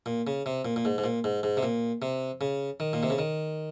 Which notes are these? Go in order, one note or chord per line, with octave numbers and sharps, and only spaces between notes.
A#2
C#3
C3
A#2
A#2
G#2
G#2
A#2
G#2
G#2
C3
A#2
C3
C#3
D#3
A#2
C3
C#3
D#3